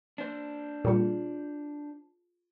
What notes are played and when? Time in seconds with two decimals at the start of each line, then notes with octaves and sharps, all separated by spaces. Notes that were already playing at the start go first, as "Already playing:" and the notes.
0.18 D4 C5
0.85 A#2 G3 F4 G#4